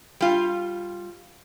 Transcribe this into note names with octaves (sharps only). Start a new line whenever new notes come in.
G3 F4